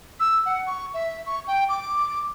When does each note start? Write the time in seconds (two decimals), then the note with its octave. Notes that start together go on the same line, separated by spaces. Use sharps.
0.20 E6
0.46 F#5
0.67 C#6
0.94 E5
1.26 C#6
1.47 G5
1.69 D6